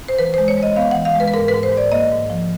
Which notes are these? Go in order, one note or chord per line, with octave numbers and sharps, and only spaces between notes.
C5
E3 B4
C5
G#3
C#5
G#3
D#5
B3 F5
F#5
E3
F5
G#3 B4
B4
G#2 A#4
B4
G#2
C5
G#2
D5
A#3 D#5
G#2
F3